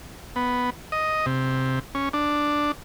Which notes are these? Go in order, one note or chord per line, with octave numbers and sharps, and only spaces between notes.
B3
D#5
C3
C#4
D4